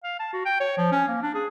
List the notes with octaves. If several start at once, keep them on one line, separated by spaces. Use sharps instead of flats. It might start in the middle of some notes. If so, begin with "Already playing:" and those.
F5
A5
F#4
G5
C#5
F3
C#4
A#3
D4
G#4